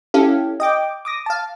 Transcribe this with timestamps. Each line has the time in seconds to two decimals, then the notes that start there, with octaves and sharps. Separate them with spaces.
0.14 C#4 E4 G4 A4 F5
0.60 D#5 G5 D6
1.05 D6 D#6 A#6
1.26 F5 A5